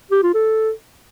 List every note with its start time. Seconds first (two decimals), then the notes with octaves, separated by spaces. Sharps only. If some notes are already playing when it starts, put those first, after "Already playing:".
0.11 G4
0.23 F4
0.34 A4